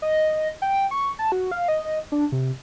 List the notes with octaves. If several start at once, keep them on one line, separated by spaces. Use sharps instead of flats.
D#5
G5
C#6
A5
F#4
F5
D#5
D4
C3